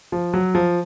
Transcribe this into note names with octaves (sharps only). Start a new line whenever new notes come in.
F3
F#3
F3